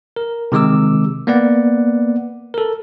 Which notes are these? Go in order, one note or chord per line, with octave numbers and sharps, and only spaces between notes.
A#4
C3 D#3 G#3 D6 E6
A#3 B3 B4 D5 F#5
A4 A#4